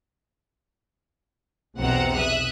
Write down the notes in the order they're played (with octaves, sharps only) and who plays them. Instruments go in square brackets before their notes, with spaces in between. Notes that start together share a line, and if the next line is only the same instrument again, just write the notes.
[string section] B1 E2 C3 C4 F#5 A#5
E5 D#6 F#6